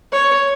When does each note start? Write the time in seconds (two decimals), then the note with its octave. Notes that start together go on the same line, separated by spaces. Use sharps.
0.12 C#5